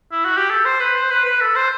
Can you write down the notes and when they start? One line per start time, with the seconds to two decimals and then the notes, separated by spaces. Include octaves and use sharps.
0.12 E4
0.24 F#4
0.37 G4
0.50 A4
0.65 C5
0.80 B4
0.95 C5
1.11 B4
1.25 B4
1.41 A4
1.56 C5